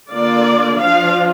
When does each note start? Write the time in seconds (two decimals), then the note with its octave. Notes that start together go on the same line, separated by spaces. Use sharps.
0.11 D3 A#3 F4 D5
0.79 F3 D4 F4 F5